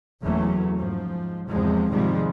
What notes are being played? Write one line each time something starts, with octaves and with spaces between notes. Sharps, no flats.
F#1 E2 E3 F#3 A3 C#4
G#2 F3
E2 C3 F3 G#3
G#2 C3 D#3 F3 G3 G#3